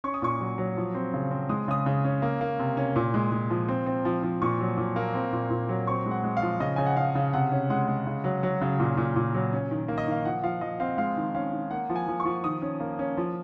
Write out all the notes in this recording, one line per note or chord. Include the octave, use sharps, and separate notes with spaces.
C#4 C#6
D#6
A#2 C#6
F#3
F#3
F3
C4
C#3
C4
G#3 D#6
C#3 D#6
C#3
C#4
A#3
A#3
C3
C#4
A#2
G#3
G#3
F3
C4
C4
F3
F3
A#2 C#6
F#3
A#2
A#3
C4
A#2
A#2
F#3
C4 C#6
G#3
F#5
G#3
F5
F3
C#3 D#5
C#3 G#5
F#5
C#3 F5
C#3
C3 F#5
C#4
G#3 F#5
G#3
C#3
F#3
F#3
C#3
A#2
A#2
A#2
F#3
C#4
D#3
A#3
D#5
D#3 F5
F3 F#5
F3 F5
F3 D#5
C4 F5
G#3 F5
D#3
C#4 F5
D#3
A#3 F#5
F3
G#5
F3
C#6
F3
D#3 D#6
C#4
A#3
C#4
F3